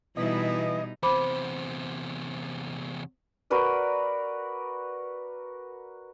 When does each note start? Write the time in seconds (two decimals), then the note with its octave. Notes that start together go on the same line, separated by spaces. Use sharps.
0.17 B2 E3 G3 B3 D#4 E4 D#5
1.03 E2 C3 C5 B5 D6
3.50 F#4 A#4 B4 D5